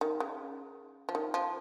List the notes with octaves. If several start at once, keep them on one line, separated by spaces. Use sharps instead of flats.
D#3
C#3
F3
D#3
F3